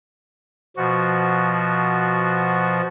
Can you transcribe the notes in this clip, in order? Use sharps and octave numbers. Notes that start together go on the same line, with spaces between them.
B2 F3 F#4